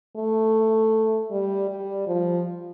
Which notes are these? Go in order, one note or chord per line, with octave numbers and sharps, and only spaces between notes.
A3
G3
G3
F3